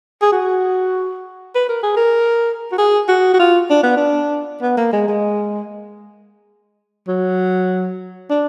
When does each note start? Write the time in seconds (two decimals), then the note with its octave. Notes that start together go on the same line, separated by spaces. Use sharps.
0.22 G#4
0.32 F#4
1.55 B4
1.69 A#4
1.83 G#4
1.96 A#4
2.72 F#4
2.78 G#4
3.08 F#4
3.34 F#4
3.39 F4
3.70 D4
3.83 B3
3.97 D4
4.62 B3
4.77 A#3
4.93 G#3
5.08 G#3
7.07 F#3
8.30 D4